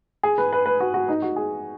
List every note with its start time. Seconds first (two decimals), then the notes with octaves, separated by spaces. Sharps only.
0.23 G#4
0.38 B4
0.53 B4
0.66 B4
0.80 F#4
0.94 F#4
1.08 D#4
1.22 F#4
1.36 G#4